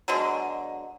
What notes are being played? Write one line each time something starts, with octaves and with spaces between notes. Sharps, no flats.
B2 D3 F#3 G#3